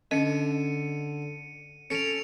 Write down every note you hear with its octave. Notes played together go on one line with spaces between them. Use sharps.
D3 C#4 D#5 C#7 D#7
C#4 A4 C#7 D7 F7